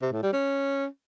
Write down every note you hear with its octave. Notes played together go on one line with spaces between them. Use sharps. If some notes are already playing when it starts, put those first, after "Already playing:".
C3
A2
G3
C#4